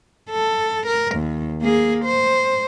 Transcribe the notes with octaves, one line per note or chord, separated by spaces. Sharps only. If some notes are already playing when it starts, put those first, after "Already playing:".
A4
A#4
D#2
A#3 G#4
C5